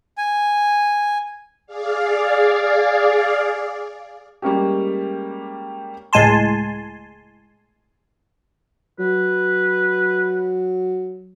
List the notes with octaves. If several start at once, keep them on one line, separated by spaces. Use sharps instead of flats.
G#5
G#4 D5 F5
G3 G#3 A#3 C#4 G4
C#2 A2 G#3 G#5 A5 C6
F#3 B4